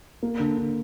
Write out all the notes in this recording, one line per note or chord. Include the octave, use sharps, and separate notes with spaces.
A#3
D3
D3